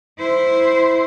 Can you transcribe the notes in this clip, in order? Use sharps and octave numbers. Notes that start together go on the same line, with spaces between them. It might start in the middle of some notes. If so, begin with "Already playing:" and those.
E4 C5